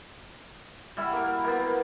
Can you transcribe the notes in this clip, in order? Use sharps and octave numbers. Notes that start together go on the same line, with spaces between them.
G3 E4 F#4
A#3 A#4
A#3 B3